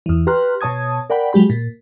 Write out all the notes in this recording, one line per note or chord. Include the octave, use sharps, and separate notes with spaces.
E2 E3
G4 B4 A#5 C6 F6 F#6
B2 C#5 A5 D#6 G#6
A#4 D5 F#5 G5 B5
F#3 G#3 G4 B5
A#2